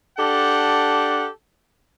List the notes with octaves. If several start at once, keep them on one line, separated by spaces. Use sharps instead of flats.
D4 G4 A4 F#5